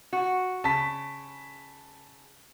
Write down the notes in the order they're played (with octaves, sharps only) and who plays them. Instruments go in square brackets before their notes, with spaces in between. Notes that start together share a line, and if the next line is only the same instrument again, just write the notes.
[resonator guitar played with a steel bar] F#4
[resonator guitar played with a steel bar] C#3 [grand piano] A5 B6